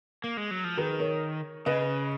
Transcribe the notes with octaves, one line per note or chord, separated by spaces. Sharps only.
A#3
G#3
F#3
F3
D#3 G#4 B4
A#4 C#5
C#3 B4 D#5